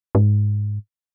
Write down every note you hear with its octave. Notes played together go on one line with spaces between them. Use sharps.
G#2